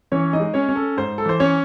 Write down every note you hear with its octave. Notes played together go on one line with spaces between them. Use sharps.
E3 C#4 C#5
D#4 D#5
G#3
C#4 C#5
C#4
A4
G#2 C5
A4
E3 C5
C#4 C#5